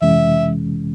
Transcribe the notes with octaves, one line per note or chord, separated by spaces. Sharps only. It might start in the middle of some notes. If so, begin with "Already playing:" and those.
F2 C3 E3 G#3 C#4 E5